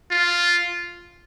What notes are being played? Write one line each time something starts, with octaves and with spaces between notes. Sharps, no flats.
F4